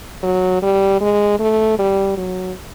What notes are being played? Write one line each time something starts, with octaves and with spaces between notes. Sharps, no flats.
F#3
G3
G#3
A3
G3
F#3